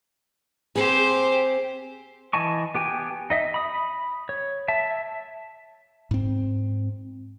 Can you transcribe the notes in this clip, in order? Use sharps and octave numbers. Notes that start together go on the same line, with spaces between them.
C4 G4 G#4 C5
E3 D#5 G#5 A5 C#6
B3 G4 G5 G#5
D#4 D#5 E5
B5 D#6
C#5
E5 A5
G#2 C4